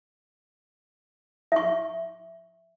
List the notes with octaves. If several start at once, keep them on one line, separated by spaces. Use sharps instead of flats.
E5 C#6